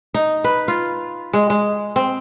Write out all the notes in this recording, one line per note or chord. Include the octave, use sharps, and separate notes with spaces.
D#4
B4
F4
G#3
G#3
C4